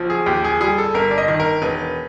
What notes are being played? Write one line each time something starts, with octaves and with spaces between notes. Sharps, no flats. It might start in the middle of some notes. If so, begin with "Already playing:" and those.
Already playing: B1 F3
G#4
D#2 G4
G#4
G3 G#4
A4
G1 A#4
D5
D#5
D#3
A#4
E1 B4